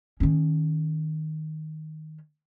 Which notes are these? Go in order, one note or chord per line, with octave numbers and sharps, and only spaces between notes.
D#3 C#4